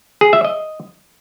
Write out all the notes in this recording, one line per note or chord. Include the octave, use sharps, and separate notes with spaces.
G#4
E5
D#5